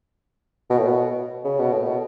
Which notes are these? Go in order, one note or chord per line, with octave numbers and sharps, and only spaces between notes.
B2
A2
B2
C#3
B2
A2
B2